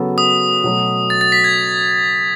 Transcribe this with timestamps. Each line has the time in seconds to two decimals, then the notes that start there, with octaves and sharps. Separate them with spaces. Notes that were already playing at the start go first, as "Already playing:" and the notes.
Already playing: C#3 F#3 B3 F#4 A4
0.18 D#6
0.64 B2 F#3 A3
1.10 A6
1.21 A6
1.32 B6
1.44 G#6